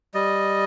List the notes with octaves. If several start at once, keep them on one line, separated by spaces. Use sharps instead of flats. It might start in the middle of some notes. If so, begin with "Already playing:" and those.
G3 D#5